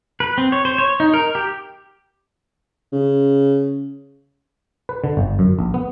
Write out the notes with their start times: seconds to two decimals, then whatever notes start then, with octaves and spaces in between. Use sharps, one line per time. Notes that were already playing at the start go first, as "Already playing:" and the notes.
0.20 B4
0.38 C4
0.52 C#5
0.65 C5
0.78 C#5
1.00 D#4
1.14 A#4
1.35 G4
2.92 C#3
4.89 B4
5.04 D3
5.17 G1
5.39 F#2
5.59 A#1
5.74 B3